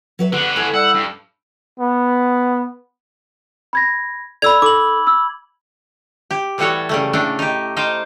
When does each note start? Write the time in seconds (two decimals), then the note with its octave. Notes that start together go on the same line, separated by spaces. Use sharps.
0.19 F#3 B4 E5
0.32 D3 B3 G#4
0.56 E4 A4 G#5
0.74 G3 F#5 E6
0.94 G2
1.80 B3
3.73 B5 G#6 A#6
4.42 A4 D5 B5 E6 G#6 F7
4.62 D#4 A4 D6 F#7
5.07 E6
6.31 G4
6.58 A2 E3 G3 F#4 A4 C#5
6.89 C#3 G3 A3
7.13 A2 C#3 A3 D4
7.39 D#4 G4
7.76 D#4 C5 D#5 F5 G5